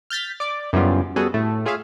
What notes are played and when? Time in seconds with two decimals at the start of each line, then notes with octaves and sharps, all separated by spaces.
0.10 F6 G6 A6 B6
0.40 D5 D6
0.73 F#2 C#3 E3 G3 B3 F4
1.16 G3 B3 F#4 G#4 A4 G#5
1.34 A2 A3
1.65 F4 G#4 C#5 E5 F5